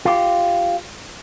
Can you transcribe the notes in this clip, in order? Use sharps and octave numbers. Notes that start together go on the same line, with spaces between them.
F4 G4